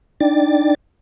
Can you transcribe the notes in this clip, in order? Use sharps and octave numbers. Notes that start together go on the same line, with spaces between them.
D4 D#4 D5 G5 A6